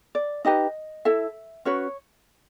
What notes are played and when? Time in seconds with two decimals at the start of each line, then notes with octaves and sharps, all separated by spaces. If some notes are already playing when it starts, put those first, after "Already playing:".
0.15 D5
0.45 D#4 G4 B4 D#5
1.05 E4 A4 E5
1.65 C#4 F#4 B4 C#5